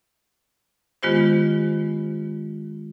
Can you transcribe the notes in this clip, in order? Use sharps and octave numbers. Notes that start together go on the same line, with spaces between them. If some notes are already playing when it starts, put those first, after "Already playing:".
D#3 G#3 B3 F4 G4 C5